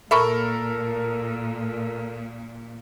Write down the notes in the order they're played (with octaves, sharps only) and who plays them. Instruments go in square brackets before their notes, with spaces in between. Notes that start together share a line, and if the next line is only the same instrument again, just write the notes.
[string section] A#2 [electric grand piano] A4 A#4 [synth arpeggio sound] E5 B5 C#6